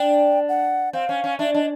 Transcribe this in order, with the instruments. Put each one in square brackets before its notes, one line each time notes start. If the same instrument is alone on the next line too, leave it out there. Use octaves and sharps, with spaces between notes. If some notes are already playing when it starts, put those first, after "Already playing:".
Already playing: [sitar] D4 [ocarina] G5
[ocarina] F#5
[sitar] C4 [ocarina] F5
[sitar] C#4
C#4
[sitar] D4 [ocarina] E5
[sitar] D4 [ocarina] D#5